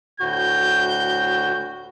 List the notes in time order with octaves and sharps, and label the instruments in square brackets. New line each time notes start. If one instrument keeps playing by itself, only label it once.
[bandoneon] D2 A2 F#4 [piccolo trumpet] G6